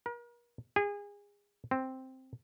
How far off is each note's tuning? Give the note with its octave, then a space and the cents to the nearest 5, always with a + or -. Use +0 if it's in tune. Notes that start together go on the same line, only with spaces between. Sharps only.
A#4 +40
G#4 -30
C4 +0